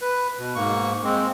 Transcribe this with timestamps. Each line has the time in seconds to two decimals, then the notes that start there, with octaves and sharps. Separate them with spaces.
0.01 B4
0.38 B2
0.55 G#2 A#3 C#6
1.04 G#3 C4